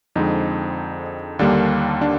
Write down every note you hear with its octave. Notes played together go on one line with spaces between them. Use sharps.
F2 D3 G#3 C4 D#4
D#2 D3 G3 A#3 D4
D4